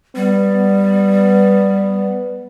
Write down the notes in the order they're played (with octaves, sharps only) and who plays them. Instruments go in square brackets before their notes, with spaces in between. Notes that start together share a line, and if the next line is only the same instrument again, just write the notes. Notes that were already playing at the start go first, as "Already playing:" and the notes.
[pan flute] G3 [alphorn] B3